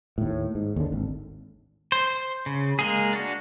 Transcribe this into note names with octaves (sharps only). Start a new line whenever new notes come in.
D#2 A2
G#2
D#2 D3
G#1
C5
C#3
G#3 A#3 G#4
D4 F#4